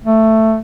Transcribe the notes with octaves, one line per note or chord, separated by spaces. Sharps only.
A3